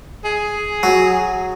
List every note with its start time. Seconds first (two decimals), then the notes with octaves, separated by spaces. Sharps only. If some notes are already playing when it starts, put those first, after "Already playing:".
0.25 G#4
0.83 F#3